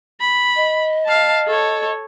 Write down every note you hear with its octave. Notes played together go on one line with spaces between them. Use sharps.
B5
D#5
F5 A5
A4 C#5